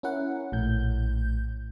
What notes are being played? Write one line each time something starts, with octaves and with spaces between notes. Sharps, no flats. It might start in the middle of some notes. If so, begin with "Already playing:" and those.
C#4 E4 A#4 F#5
A#1 A2 G6